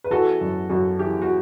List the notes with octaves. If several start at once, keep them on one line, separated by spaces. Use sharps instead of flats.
B4
E3 F#4 A4
F#2
F#2 F#4
E3 G4
F#4